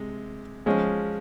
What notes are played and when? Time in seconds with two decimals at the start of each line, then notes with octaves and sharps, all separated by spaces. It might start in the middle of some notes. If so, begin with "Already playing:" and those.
Already playing: C3 G#3
0.66 F3 G#3 C#4